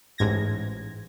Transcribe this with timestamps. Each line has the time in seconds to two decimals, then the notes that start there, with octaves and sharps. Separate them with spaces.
0.18 A1 G#2 G#6 A#6